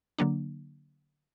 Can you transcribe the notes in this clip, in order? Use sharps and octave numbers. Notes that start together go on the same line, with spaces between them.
D3 F#3 A#3 D4